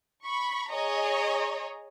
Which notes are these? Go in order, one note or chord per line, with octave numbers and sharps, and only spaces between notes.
B5 C#6
G#4 C#5 D#5 A#5